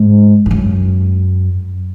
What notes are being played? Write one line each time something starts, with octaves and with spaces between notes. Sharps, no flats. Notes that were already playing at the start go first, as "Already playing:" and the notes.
Already playing: G#2
G#2
F#2